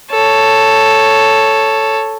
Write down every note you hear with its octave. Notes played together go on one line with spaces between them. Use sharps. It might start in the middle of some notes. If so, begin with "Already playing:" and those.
A4 C#5